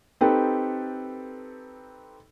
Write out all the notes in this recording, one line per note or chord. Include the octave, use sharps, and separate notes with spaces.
C4 D#4 G4 A4 B4